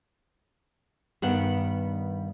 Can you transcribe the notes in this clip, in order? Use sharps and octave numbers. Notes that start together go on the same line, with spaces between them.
G2 D#3 B3 F#5